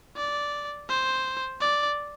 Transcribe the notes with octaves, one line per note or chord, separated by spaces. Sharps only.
D5
C5
D5